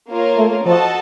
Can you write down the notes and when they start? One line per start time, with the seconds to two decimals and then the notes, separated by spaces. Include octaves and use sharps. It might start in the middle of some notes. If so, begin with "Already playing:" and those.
0.09 A#3 F4 A#4 C#5
0.37 A3
0.66 F3 F#4 A4 D#5 A5